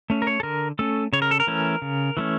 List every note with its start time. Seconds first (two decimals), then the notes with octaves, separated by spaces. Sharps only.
0.10 A3 C#4
0.22 A#4
0.27 C#5
0.40 A4
0.43 D3 A#4
0.79 A3 C#4 A4
1.13 C#3 C#5
1.22 A#4
1.31 A4
1.40 A#4
1.47 E3 A3 C#4
1.82 C#3
2.17 E3 A3 C#4